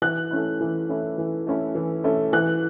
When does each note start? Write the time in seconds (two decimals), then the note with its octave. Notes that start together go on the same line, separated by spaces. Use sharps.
0.02 E3 F#6
0.31 A3 C#4 E4
0.61 E3
0.89 A3 C#4 E4
1.18 E3
1.47 A3 C#4 E4
1.75 E3
2.04 A3 C#4 E4
2.33 E3 F#6